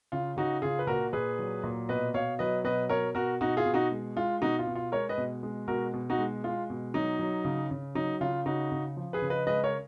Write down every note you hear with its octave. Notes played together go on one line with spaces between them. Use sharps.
C#3 F4
C#3 D#4 F#4
C#3 F4 G#4
B4
A#2 F#4 A#4
A#2 G#4 B4
F#3
A#2
B2 B4 D#5
B2 C#5 F5
F#3 B4 D#5
B2 B4 D#5
B2 A#4 C#5
B2 F#4 A#4
B2 D#4 F#4
F4 G#4
B2
D#4 F#4
G#3
G#3 F4
B2 D#4 F#4
F4
B2
F4
G#3 A#4 C#5
B4 D#5
B2
G#3
B2 F#4 A#4
B2
D#4 F#4
G#3
G#3 F4
B2
F#3 D#4
F#3
C#3
C#3
F#3 D#4
C#3 F4
C#3 D#4 F#4
C#3
F3
G#4 B4
C#3
B4 D#5
G#3 B4 D#5
A#4 C#5